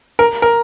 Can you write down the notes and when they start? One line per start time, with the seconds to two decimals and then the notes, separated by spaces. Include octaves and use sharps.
0.19 A#4
0.42 A#4